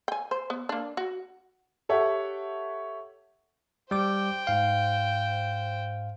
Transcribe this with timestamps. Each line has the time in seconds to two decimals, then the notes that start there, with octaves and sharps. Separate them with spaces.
0.08 G5 G#5
0.31 C5
0.50 B3
0.69 A#3 D4
0.97 F#4
1.89 G4 A4 C#5 E5 F#5
3.91 G3 C5 G5 D6
4.47 G#2 F5